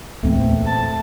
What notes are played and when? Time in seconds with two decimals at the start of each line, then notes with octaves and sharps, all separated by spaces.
0.23 E2 A#2 A3 C4
0.66 A5